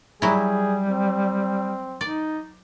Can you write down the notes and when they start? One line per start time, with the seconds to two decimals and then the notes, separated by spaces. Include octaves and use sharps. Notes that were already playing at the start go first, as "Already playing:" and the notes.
0.22 F#3 G3 E4 G#4
0.89 C4
2.01 D#4 D5